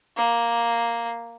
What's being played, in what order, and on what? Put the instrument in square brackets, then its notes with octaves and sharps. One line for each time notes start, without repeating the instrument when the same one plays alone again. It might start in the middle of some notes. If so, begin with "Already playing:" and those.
[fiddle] A#3